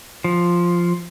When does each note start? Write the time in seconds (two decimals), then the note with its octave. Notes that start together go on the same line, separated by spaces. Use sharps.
0.24 F3